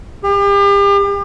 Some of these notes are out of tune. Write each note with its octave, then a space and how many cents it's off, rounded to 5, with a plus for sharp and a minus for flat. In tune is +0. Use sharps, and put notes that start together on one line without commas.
G4 +40